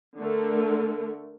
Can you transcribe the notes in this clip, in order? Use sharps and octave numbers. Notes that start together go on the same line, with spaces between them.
D3 A3 A4 A#4